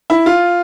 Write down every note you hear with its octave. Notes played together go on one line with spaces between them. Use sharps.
E4
F4